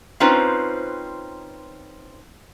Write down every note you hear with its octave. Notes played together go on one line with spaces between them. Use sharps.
C4 C#4 D#4 F4 B4 C5